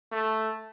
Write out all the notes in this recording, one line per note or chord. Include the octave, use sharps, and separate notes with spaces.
A3